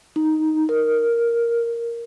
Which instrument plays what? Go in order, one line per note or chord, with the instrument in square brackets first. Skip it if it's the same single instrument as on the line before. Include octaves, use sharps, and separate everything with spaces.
[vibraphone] D#4
A#4